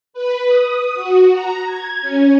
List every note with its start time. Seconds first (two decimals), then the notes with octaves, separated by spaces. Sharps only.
0.13 B4
0.47 D#6
0.94 F#4
1.32 A#5
1.65 G#6
2.01 C#4